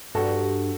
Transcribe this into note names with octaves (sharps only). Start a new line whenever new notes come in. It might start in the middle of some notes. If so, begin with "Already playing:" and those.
G2 F#4 A4